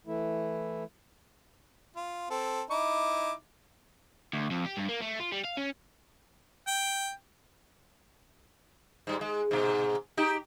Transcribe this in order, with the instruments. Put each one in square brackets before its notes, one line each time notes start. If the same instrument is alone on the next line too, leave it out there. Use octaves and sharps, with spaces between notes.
[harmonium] E3 A3 E4
[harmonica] F4
C4 A4
D#4 E4 D6
[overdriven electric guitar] D2
F2
G4
G2
A#3
A3
F4
G3
F5
C#4
[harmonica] G5
[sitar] G#2 G3
G#3
G#2 B2
D#4 G4